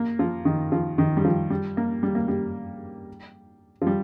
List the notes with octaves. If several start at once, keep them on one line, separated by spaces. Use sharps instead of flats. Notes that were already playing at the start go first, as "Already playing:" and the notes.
Already playing: A#3
F3
D#3
F3
D#3
G3
F3
G3
A#3
G3
A#3
G3
F3
G3